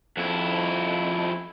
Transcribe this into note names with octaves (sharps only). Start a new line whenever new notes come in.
F2 E4